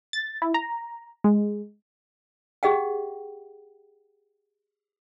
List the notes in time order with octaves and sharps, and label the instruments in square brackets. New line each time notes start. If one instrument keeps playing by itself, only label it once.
[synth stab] A6
E4
A#5
G#3
[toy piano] G4 G#4 D#5 F#5 G5